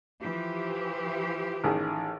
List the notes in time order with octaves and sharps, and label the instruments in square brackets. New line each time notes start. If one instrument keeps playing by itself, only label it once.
[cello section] E3 F3 G4
[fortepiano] A1 D#3 G#4